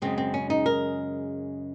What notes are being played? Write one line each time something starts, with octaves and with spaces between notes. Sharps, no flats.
F#2 C#3 G#3 C4
C4
C#4
D#4
A#4